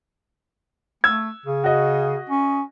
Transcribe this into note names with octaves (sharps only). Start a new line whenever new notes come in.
A3 E6 G#6
C#3
F#4 D#5
C#4